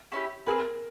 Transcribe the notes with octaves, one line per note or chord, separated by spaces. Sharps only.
A3 C#4 E4 G4
C4 D#4 G#4 A#4 B4